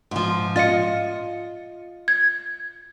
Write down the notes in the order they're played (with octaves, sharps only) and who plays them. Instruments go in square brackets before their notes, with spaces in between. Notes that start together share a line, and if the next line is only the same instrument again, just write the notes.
[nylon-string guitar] G#2 F3
[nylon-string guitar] F4 D#5 [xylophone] A6 C#7
[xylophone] G#6